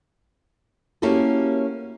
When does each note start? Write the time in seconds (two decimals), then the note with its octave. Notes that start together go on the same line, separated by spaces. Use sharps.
1.02 A#3 C#4 E4 F#4 G4 A4